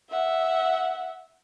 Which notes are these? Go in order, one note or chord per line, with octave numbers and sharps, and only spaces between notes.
E5 F#5